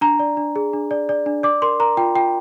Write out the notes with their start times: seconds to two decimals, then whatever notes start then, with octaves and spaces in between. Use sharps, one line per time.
0.01 D4 A#5
0.19 D5
0.37 D4
0.56 G#4
0.73 D4
0.91 D5
1.09 D5
1.26 D4
1.43 D5 D6
1.62 A#4 C6
1.80 A#4 A#5
1.97 F4 G5
2.15 F4 G5